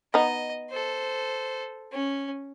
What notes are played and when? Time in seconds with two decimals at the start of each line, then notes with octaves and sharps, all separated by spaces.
0.14 B3 D#4 D#5
0.70 A4 C5
1.92 C#4